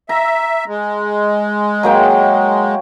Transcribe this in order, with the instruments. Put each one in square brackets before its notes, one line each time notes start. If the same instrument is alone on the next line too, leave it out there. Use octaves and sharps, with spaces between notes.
[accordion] E5 [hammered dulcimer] A#5
[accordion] G#3
[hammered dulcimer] F#3 A#3 G5